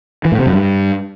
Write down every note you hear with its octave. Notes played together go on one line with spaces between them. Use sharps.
E3
A2
C3
F#2
G2